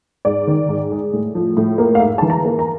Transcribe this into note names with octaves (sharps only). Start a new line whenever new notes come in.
G#2 D5
D#3
G#2
G#3
A2
F3
A2
A#3
F5
G#2 E5
E3 A5
A#5
A#3
A#5